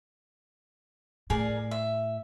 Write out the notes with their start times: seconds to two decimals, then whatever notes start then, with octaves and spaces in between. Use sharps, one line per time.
1.30 A2 G#4 A#4 D5
1.71 E5